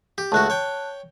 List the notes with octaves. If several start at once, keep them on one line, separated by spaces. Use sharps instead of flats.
G4
C#2 A3 F#4 A5 F#6
C#5 G5